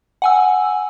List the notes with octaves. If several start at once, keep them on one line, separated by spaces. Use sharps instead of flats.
F#5 G#5 E6